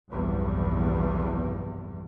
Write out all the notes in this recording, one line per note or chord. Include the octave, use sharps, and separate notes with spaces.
F1 B1 E2 G2 G3